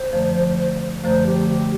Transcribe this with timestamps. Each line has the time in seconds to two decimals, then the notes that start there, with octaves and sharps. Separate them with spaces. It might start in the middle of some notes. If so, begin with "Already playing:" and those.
Already playing: C5
0.13 F#2 D3 F3 A3
1.04 F#2 D3 F3 A3 C5
1.26 G4
1.49 G4